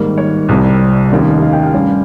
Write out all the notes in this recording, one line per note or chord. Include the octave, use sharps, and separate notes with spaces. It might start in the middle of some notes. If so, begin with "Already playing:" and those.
Already playing: G#2 D#3 G3 A#3 A#4
C#5
C2 C3 G3
F1 D#2 D#3 A#3 C#4
D#5
F5
G5
F5
G2 G3 C#4